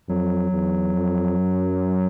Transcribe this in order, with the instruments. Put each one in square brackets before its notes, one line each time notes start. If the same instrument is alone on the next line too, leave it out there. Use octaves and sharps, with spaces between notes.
[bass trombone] F2 [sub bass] F#3
[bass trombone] E2
F2
F#2